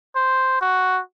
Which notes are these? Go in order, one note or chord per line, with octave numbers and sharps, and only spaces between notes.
C5
F#4